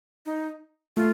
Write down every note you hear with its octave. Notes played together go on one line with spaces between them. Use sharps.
D#4
A3 F4